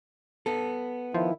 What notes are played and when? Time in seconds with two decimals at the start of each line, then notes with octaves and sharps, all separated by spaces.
0.46 B3 A4
1.14 D#3 F3 E4